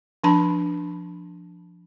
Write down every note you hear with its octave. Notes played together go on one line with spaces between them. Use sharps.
F3 D4 A5 B5